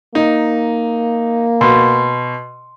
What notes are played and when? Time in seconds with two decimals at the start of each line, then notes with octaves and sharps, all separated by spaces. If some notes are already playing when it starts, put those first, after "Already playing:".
0.15 A#3 D#4
1.61 B2 C6